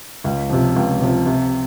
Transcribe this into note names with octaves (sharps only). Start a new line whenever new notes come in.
C#2
C3 F3
C#2
C3 F3
C3